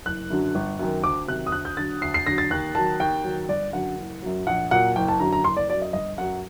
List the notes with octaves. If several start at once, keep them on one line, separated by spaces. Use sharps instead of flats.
F#1 F#6
F#2 D3 F#3
G1
F#2 D#3
D2 D6
C3 D#3 F#3 F#6
D#6
D2 F#6
G6
D3 F#3 A6
D2 C7
C7
D3 F#3 A#6
A6
D#2 F#6
D#3 F#3 A5
D#2 G5
D#3 F#3
G1 D5
F#2 D3 F#3 F#5
F#1
F#2 F#3
A#1 F#5
A#2 F#3 F#5
F#1 G5
A5
F#2 D3 F#3 A#5
A#5
F#1 C6
D5
F#2 F#3 D5
D#5
G1 D#5
F#2 F#3 F#5